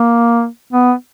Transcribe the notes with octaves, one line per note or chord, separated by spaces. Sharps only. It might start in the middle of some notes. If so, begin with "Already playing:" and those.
Already playing: A#3
B3